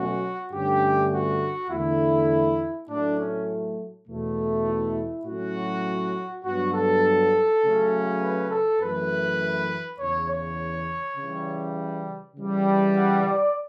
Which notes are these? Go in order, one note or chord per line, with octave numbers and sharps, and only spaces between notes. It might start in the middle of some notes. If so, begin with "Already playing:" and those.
Already playing: B2 F#3 A3 C#4 F#4
G2 D3 A3 C#4 G4
F#4
E2 D3 A3 E4
A2 F#3 A3 D4
C#4
E2 B2 A3
E4
A2 F#3 C#4 F#4
G2 F#3 B3 F#4
A4
C#3 F#3 A3 C#4
B4
A4
F#2 E3 A3 B4
E2 C#3 E3 C#5
C#5
C#3 E3 G3
C#3 E3 G3
F#5
D5